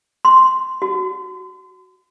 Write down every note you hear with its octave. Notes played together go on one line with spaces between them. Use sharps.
C6
F#4